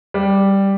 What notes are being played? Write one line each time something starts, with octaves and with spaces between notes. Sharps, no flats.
G3